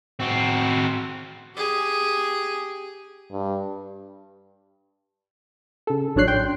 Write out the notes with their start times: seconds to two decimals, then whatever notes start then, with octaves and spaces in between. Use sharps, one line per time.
0.20 C4 F#4
1.56 G4 G#4
3.32 G2
5.87 C#3 A4
6.16 A1 F#3 D4 C#5 F#6 C7
6.28 G5 C6